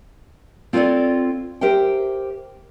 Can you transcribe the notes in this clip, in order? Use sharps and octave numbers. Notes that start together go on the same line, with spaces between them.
C4 F4 A4 B4 C#5 D5
G4 A#4 C5 E5 G5